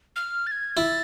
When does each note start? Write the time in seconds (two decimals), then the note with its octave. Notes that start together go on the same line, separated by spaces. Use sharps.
0.16 F6
0.47 A6
0.51 G#6
0.77 E4 A6